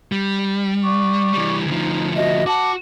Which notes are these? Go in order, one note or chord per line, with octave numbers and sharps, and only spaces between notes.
G3
D5 C#6 D6
E3 G3
D2 F3 D#4
F#4 D#5 E5
F#4 A5 D6